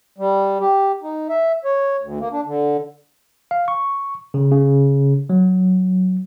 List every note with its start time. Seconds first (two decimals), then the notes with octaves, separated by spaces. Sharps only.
0.18 G3
0.60 G4
1.03 D#4
1.29 E5
1.64 C#5
2.02 D2
2.20 A#3
2.32 D4
2.46 D3
3.51 F5
3.68 C#6
4.34 C#3
4.51 C#3
5.30 F#3